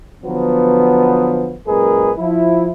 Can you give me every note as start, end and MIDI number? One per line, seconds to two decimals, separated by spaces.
0.24 1.55 50
0.24 1.55 53
0.24 1.55 54
0.24 1.55 59
1.68 2.11 42
1.68 2.11 46
1.68 2.11 56
1.68 2.11 68
1.68 2.11 70
1.68 2.11 71
2.18 2.71 53
2.18 2.71 64